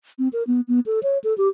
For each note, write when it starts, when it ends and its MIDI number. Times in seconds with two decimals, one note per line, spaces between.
0.19 0.28 60
0.33 0.43 70
0.47 0.61 59
0.68 0.80 59
0.86 0.99 69
1.03 1.18 73
1.24 1.36 69
1.38 1.48 67